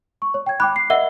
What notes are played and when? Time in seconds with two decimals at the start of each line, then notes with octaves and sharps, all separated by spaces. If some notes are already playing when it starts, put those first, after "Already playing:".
0.22 C#6
0.34 C#5
0.46 G5 G#6
0.60 G5 B5 D6 F#6
0.76 C7
0.90 A#4 D#5 E5 F#5 G7